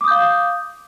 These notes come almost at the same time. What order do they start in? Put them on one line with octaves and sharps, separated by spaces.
D6 D#6 G6 F5